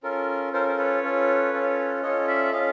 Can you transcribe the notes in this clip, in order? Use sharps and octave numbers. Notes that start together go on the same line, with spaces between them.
C#4 F4 A4 A#4
C#4 F4 A4 A#4 C5
C5
B4 C#5
C#4 F4 A4
C#4 F4 A4
C#4 F4 A4 C#5 D#5
D5 E5
C#4 F4 A4 D#5 F5